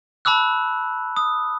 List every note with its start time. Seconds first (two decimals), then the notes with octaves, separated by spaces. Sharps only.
0.25 A5 B5 D6 E6 F#6
1.17 D#6